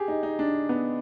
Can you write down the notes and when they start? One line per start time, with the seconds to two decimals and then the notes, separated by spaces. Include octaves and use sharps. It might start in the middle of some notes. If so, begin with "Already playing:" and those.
Already playing: G4 G#4
0.08 D#4
0.23 D#4
0.39 D4
0.69 B3